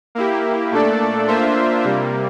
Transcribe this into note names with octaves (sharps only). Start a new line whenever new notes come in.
A#3 E4 G4
A#2 A3 D4 A4 D5
A#3 D4 F4 C5 E5
C3 G3 A#3